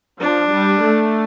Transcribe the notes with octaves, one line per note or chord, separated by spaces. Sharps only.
F3 D4
G3
A3